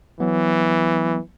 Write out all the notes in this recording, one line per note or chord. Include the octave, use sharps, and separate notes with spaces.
E3 F#3 B3